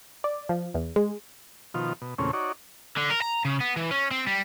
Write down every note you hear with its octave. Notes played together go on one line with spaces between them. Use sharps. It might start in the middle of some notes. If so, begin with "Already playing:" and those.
D5
F3
E2
G#3
B2 D#3 F3 F4
B2
E2 A#2 C#3 A3 C4 C#4
D#4 F#4 C#5 D5
D3
A#4
A#5
C#3
B3
E3
C#4
C4
G3